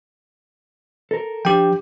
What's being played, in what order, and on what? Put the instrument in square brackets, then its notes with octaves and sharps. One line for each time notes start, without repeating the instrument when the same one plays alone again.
[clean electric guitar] A4 A#4
[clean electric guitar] F3 D4 [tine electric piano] G4 G5